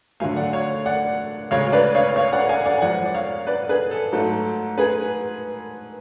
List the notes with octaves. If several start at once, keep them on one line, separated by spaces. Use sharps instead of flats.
D2 D3 F#3 A3 F5 G#5
D5 F#5
C#5 F5
D5 F#5
D2 C#3 G#3 C#5 F5
B4 D5
C#5 F5
C#5 F5
D5 F#5
F5 G#5
D5 F#5
G#5
F#2 F3 G#3 D5 F#5
D5
C#5 F5
B4 D5
G#4 B4
A4
G#2 F#3 A3 A4
G#4 B4